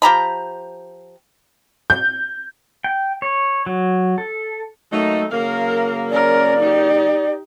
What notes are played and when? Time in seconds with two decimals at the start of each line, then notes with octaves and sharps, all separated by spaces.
0.02 F3 G4 A#5 B5
1.90 G6
2.84 G5
3.22 C#5
3.66 F#3
4.18 A4
4.92 F#3 A3 A#3 D#4
5.32 C#3 F#3 A#3 A#4 F5
6.10 C#4 A#4 D5
6.59 D#4 G4